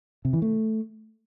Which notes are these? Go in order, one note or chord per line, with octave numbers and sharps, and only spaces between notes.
C3
E3
A3